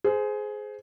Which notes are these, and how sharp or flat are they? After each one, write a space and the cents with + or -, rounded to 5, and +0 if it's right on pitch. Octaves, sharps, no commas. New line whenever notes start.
G#4 +15 C5 -15